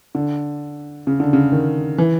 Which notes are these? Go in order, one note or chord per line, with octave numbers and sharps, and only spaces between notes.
D3
C#3
D3
C#3
D#3
E3